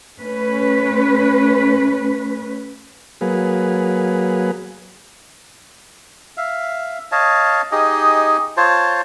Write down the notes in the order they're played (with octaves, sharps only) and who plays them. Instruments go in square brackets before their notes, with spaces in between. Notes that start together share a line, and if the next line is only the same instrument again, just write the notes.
[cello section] A3 C#4 B4
[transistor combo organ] F#3 A#3 G#4 B4
[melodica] E5 F5
C#5 D#5 F5 A5
D#4 G4 G#4 D#5
F4 C5 C#5 A5